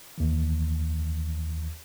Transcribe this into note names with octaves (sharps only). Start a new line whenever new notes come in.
D#2 E3